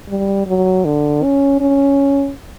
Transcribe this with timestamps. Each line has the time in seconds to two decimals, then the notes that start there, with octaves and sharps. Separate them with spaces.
0.09 G3
0.47 F#3
0.85 D3
1.23 C#4
1.61 C#4